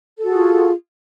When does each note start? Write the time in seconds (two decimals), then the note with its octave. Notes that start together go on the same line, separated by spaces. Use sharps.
0.18 A4
0.23 F#4
0.28 G#4
0.32 F4